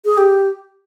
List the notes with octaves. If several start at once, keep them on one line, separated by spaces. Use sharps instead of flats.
G#4
G4